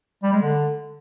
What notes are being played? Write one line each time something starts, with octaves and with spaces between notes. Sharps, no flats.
G3
G#3
D3